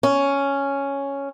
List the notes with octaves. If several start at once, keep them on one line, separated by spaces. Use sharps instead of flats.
C#4